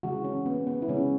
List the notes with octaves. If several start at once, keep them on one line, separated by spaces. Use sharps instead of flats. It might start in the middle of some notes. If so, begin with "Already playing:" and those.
C#3 E3 G#3 F#4
C#4
B3
B3
E4
C#3 E3 G#3 C#4